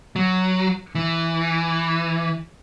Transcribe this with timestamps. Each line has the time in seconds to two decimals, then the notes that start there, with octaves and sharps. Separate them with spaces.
0.16 F#3
0.95 E3